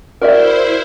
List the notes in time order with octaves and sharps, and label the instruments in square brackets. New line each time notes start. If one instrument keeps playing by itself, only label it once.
[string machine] E4 C5 [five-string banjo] F#4 D5 E5 [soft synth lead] A#4